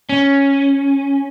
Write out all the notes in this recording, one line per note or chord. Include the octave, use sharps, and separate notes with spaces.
C#4